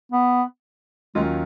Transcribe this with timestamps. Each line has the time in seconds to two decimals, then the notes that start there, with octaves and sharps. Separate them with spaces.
0.12 B3
1.15 D#2 D#3 F#3 G#3 C#4 F4